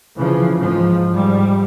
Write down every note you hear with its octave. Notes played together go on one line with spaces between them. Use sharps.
C#3 E3 F3
G#2 F3
G#2 G3